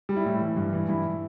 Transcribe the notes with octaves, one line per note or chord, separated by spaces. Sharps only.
G3
E4
A2
E3
G2
E3
G2 E4